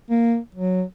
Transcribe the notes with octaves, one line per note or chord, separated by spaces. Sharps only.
A#3
F#3